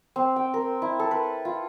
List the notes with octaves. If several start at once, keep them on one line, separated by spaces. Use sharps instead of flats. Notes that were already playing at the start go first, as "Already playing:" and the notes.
C4
G5
A#4
E4
A4
B4
F4